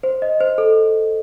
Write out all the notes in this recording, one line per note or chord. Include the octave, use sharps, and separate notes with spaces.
C5
D#5
C5
A4